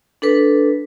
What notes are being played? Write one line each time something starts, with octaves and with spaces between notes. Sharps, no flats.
D4 A4 B4